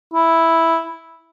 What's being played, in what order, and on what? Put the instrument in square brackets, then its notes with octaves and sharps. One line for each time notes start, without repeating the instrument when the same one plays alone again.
[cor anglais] E4